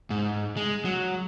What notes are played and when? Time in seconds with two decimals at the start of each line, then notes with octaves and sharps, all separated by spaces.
0.10 G#2
0.57 G#3
0.85 F#3